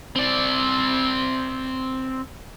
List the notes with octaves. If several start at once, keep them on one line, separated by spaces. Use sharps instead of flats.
C4 D5